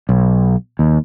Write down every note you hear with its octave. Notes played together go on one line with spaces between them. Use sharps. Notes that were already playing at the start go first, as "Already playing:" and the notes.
B1
D#2